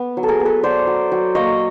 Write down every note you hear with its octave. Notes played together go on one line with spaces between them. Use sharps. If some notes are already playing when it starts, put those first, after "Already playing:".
Already playing: B3
F#3
A4
G#4 A#4
B3
A4 B4
F#3 C5 D5
F#3
F#3
A#3 C#5 D#5